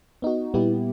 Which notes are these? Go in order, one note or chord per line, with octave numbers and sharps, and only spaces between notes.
B3 D#4 F#4
A#2 G3 B3 E4 G4